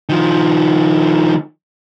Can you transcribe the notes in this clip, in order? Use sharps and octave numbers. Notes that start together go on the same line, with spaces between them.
D#3 F3